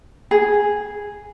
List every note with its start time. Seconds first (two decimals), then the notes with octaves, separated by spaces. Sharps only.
0.31 G#4